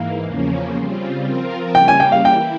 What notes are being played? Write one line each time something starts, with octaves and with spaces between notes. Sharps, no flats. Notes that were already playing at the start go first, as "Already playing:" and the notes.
Already playing: G#2 E3 A#3 F5
E2 C#3 F3 A#3 C#4
C#3 G3 C4 F4
F3 C4 F4 A#4
C#3 G3 A#3 C#4 G4 G5
G#5
G5
F5
E3 A#3 E4 G5